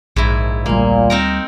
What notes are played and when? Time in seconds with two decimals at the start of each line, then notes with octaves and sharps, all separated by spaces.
0.16 A#1 G#2 E4
0.66 D2 A#2 G3 A#3
1.10 C4 D#4 A#4